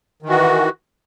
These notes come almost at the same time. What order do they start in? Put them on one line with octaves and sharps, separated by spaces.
D#3 E3 F#4